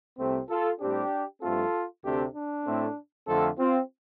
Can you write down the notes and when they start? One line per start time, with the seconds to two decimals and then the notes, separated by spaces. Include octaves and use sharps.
0.19 C2 C3 A3 C4
0.49 F4 A4
0.81 A2 G3 C4 D4 G4
1.42 G2 F3 A3 C4 F4 A4
2.03 D2 C3 A3 C4 D4 G4
2.35 D4
2.66 A2 A3 C4
3.27 F2 D3 A3 C4 F4 A4
3.58 C4 F4